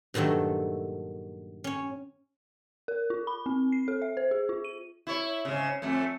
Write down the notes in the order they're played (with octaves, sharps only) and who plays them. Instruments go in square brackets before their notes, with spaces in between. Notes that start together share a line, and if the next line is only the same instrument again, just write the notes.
[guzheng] G2 A#2 D#3 F#3 A3
C#4 C#5
[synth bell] A#4
F4
B5
C4
C7
A4
E5
C5
G#4
F4
D#7
[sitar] E4 C#5
G#2 C#3
F2 A3